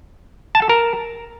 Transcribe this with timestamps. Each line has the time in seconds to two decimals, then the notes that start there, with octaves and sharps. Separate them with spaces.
0.55 A5
0.62 A4
0.69 A#4